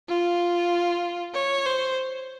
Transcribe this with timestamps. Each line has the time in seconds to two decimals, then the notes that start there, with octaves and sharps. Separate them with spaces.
0.09 F4
1.35 C#5
1.66 C5